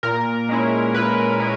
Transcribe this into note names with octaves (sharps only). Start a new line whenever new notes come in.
A#2 A#4
G#3 C#4 E4
A#2 B4
G#3 C#4 E4